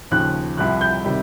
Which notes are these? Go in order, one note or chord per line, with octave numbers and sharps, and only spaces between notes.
D#2 C#3 F3 F#6
C2 C3 F3 F#6
G6
C3 D#3 G3